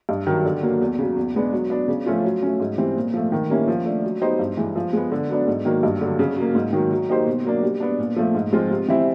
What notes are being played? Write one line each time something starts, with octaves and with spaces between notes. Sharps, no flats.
G2
D#3 F#3
D3
F#3 A#3
E2
C#3 F#3
E2
B2 G#3 B3 D4
F#3
B3 D4
C#3
F3 A3 C#4 F4
F#3
A3 C#4
G#2
E3 G3 C4
A#2
F3 A3
D#3
G3 A#3 C#4 E4
F3
A3 D4
F#3
B3 D#4 G4 C5
G2
E3 G#3
F3
G#3 B3
D3
F#3 B3 D4
G#2
D#3 F#3 A#3
G2
D3 F#3
C#3
F#3 A#3
G#2
D#3 F#3
F#3
A#3 D#4 G4 C5
B2
F#3 A#3 D4
G3
B3 D4
A#2
F3 A3
G#2
F3 G#3 C4 F4
C3
E3 G3 C4 E4